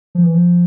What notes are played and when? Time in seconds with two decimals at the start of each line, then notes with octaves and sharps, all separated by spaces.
0.15 F3
0.24 E3
0.34 F3